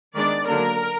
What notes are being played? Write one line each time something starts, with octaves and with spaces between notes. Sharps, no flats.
D#3 G#3 B3 D4 D5
D3 F#3 A#3 D4 A#4